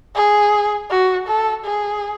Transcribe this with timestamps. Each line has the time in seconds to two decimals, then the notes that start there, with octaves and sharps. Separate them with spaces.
0.15 G#4
0.90 F#4
1.28 A4
1.65 G#4